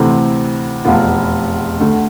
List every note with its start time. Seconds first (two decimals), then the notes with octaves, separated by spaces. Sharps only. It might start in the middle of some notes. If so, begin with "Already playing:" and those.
Already playing: D2 C3 E3 A3 C4
0.85 F1 E2 B2 B3 F4
1.80 D2 D3 A3